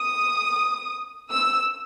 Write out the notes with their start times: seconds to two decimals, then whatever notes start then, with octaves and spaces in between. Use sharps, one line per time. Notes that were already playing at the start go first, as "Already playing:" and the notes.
Already playing: D#6
1.31 E6